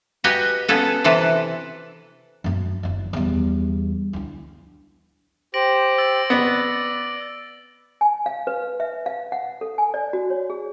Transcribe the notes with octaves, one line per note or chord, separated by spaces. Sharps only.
F#4 G4 B4 D#5 G5 G#5
B3 C#4 G#4 A4 B4
C3 E3 A4 B4
F#2 A3
F#1 D#2
E2 G3
D2 E4
G4 C5 A#6 D7 F#7
E6 A6 F#7
B3 D5
G#5
F5
B4
E5
F5
F#5
A4
G#5
D5
F#4
C#5
G#4